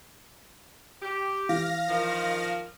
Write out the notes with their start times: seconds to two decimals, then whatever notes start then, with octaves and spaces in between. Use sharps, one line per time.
1.02 G4
1.49 E3 F5 A#6
1.88 D#3 F3